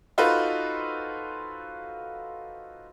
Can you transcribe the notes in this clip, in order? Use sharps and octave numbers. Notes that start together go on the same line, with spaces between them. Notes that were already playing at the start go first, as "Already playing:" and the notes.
D#4 F4 F#4 A4 B4 C5